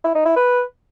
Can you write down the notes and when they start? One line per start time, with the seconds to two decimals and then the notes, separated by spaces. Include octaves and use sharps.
0.04 E4
0.15 D#4
0.26 E4
0.36 B4